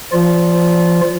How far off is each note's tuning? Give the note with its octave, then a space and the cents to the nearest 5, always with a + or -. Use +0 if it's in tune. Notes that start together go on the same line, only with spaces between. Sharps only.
F3 -30 F4 +0 D5 -30